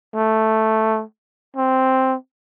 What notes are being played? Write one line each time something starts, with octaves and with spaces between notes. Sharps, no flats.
A3
C4